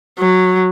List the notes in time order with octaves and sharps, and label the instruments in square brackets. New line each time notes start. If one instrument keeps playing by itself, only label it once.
[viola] F#3